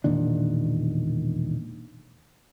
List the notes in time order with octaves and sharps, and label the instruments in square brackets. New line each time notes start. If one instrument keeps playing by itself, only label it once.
[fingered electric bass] E1 A#2 D#3 D4